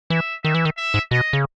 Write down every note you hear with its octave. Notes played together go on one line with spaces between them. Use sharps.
E3 E5
D#3 E5
E3
D#3
E5
G#2
B2 D#5
C#3